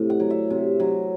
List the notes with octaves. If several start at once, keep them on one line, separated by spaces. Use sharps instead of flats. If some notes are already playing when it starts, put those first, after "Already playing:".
Already playing: A2 C3
F#5
F#3
E5
C3
F#3